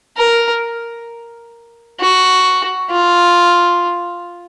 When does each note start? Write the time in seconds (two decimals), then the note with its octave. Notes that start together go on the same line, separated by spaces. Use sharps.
0.18 A#4
2.00 F#4
2.91 F4